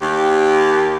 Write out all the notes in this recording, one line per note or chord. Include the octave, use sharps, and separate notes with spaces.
D#2 G4